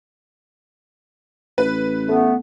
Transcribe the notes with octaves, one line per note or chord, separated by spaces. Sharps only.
A1 B4
A3 B3